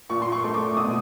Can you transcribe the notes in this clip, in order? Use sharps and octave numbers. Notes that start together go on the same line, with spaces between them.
A#2 C#6
C6
C#6
A3
D6
B2 D#6